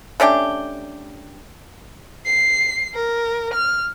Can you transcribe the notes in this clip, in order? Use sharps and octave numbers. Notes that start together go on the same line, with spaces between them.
A3 C#4 D4 G4
C7
A#4
F6